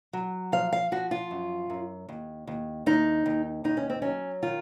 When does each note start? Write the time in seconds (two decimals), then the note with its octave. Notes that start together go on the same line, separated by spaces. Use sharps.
0.13 F#3
0.52 F3 F5
0.72 F5
0.92 F3 F#4
1.11 F4
1.31 F#2
1.70 F#2
2.09 D#2
2.47 D#2
2.86 D#2 D#4
3.26 D#2
3.64 D#2 D#4
3.77 C#4
3.90 C4
4.02 F#3 C#4
4.42 D#3 F4